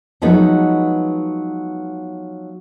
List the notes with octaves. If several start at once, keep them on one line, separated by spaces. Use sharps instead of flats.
F3 F#3 G#3 B3 D#4